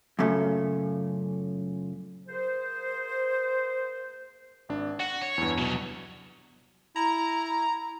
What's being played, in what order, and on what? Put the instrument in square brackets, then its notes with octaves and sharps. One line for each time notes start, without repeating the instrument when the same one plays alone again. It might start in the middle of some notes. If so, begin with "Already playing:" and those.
[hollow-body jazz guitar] F#2 A#2 C#3 A3
[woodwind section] A#3 G#4 C5
[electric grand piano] G#1 D4
[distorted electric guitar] F#4 [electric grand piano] F#5
[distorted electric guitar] C#5
[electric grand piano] E2 G2
[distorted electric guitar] C2 F#3 [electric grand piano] B2
[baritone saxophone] E4 [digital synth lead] A#5